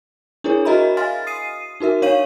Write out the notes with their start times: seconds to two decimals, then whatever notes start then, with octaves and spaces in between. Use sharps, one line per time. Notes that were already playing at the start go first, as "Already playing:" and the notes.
0.44 D4 E4 G#4 A#4 C#5
0.65 F#4 A#4 D#5 E5 A#5 B5
0.97 D#5 F5 G#5 C6 F6 A6
1.27 D#6 C7 D#7
1.80 D#4 F#4 A#4 E5
2.02 D4 C#5 F5 C#6 D#7 F#7